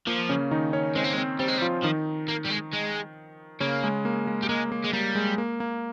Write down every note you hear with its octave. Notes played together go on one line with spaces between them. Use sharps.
F3 A#3
C#3 C#4
D#3 D#4
C#4 C#5
G#3 C4 C5
A#3
G#3
C4 C5
G3 C4 C5
G#3
G3
F3 F4
D#3 F3 D#4
A#3
G3
G#3
G#3
C#3 A#3 C#4
G#3
A#3
G#3
G3
G#3 A#3
A#3
G#3
G3 A#3
G#3
A#3
A#3